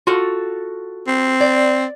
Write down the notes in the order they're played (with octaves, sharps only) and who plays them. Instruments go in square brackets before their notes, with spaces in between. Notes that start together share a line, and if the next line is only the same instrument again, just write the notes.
[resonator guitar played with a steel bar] F4 F#4 A4
[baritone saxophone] C4
[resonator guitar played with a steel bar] D5